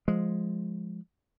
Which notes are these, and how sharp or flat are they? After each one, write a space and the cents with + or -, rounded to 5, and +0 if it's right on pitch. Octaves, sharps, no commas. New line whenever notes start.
F3 +0 G#3 +0